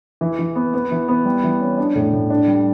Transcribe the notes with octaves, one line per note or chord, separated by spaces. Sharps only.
E3
E3
B3
B3
E3
B3
G3
E3
C#4
D4
A2
A2
D4
G3